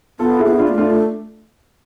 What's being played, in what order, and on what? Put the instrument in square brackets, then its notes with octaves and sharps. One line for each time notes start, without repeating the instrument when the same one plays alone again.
[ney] B3 [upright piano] F4 A4
[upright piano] F4
E4 G#4
[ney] B3
[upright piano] E4
D4 F4
[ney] B3
A3
[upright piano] D4 F4